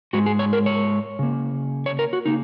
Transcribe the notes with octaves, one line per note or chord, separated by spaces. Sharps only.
G#2 G#3 F#4
G#4
C#5
A#4
C#5
C#3 A#3
C#5
A#4
F#4
C#3 A#3 D#4